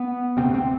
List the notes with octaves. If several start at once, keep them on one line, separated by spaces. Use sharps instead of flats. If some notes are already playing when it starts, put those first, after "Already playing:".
Already playing: B3
D2 C3 C4
C4